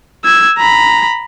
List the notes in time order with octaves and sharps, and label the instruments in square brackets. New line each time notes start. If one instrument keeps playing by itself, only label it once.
[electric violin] E6 G#6
A#5 B5